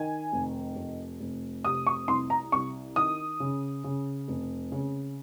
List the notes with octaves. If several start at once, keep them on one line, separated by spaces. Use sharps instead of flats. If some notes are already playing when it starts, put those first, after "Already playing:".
Already playing: D#3 G#5
F1
F1
F1
C3 D#6
C#6
C2 C6
A#5
C2 C#6
D#3 D#6
C#3
C#3
F1
C#3